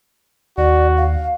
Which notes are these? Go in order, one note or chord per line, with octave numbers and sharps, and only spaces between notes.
D#2 F#4 D5
F5